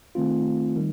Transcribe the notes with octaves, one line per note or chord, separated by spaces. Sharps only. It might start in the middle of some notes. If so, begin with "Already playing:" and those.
D#3 A3 C4 F4
D#3 G3